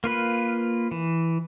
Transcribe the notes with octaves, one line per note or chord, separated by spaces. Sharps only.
A#3 F4 B4
E3